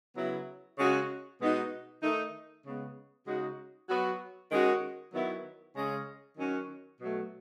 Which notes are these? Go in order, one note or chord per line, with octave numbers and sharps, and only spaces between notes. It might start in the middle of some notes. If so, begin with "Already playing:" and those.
C#3 F#3 B3 E4
C#3 G#3 C#4 F#4
B2 G#3 B3 D#4 F#4
D#3 A3 D#4
C#3 G#3 B3
C#3 G#3 D#4 F#4
F#3 B3 F#4
D#3 G#3 C#4 F#4
D#3 F#3 B3 E4
C#3 G#3 C#4
D#3 F#3 C#4 F#4
B2 F#3 A3